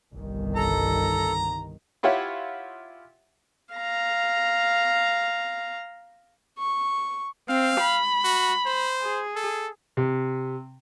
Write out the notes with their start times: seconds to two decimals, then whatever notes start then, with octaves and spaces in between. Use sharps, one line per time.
0.14 G1 C2 D#3
0.55 A4 A#5
2.03 E4 F4 G4 C#5 E5 F#5
3.75 F5 A#5
6.59 C#6
7.49 C4 F5
7.81 B5
8.24 F#4
8.66 C5
9.03 G#4
9.36 A4
9.97 C3